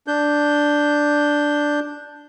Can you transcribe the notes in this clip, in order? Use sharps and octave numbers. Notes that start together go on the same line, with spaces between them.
D4 G6